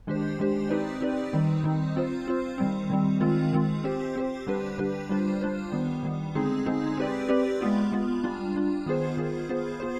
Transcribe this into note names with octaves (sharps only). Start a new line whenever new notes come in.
D#3 G#3 D4 G4 C5
D#3 G#3 D4 G4 C5
C4 D#4 G4 B4 D5
C4 D#4 G4 B4 D5
D#3 G3 C4 D#4
D#3 G3 C4 D#4
C4 F4 C5
C4 F4 C5
D#3 G3 C4
D#3 G3 C4
D#3 G#3 C4 F4
D#3 G#3 C4 F4
C4 G4 C5
C4 G4 C5
D3 G3 D4 G4 B4
D3 G3 D4 G4 B4
G3 D4 F4 C5
G3 D4 F4 C5
D#3 G3 B3
D#3 G3 B3
D3 G#3 C4 D#4 G#4
D3 G#3 C4 D#4 G#4
C4 G4 B4 D5
C4 G4 B4 D5
G#3 B3 F4
G#3 B3 F4
G3 D4 F4
G3 D4 F4
D#3 B3 F4 G#4 C5
D#3 B3 F4 G#4 C5
B3 F4 G#4 C5
B3 F4 G#4 C5